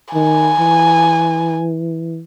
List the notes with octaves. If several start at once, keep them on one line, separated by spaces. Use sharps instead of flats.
D#3 G#5
E3